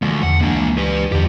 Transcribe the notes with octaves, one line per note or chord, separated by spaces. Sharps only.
D2 E3 F3 G#3
E2 D3 F#5
C#2 E3 G#3 A#3 D4
G4 B4
E2 D3 F3 G4